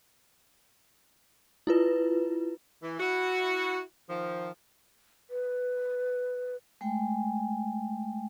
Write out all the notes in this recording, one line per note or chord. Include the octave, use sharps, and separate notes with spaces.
E4 F4 B4
E3
E4 F#4
D#3 F3
B4
G#3 A3 G5 G#5